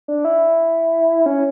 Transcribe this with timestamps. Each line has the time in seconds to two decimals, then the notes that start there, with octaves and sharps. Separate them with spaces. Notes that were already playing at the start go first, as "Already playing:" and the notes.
0.08 D4
0.25 E4
1.26 C#4